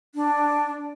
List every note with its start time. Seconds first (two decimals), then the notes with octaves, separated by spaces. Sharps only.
0.15 D4